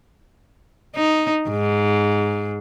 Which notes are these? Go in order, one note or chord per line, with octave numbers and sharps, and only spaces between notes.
D#4
G#2